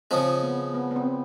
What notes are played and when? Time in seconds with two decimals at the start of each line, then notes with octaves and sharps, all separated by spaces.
0.11 C#3 F3 G#3 C4
0.43 B3
0.74 B3
0.91 B3
0.96 C4